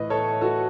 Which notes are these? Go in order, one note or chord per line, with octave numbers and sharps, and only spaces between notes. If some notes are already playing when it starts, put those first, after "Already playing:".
Already playing: A2 E3 B4 D#5
A4 C#5
F#4 A4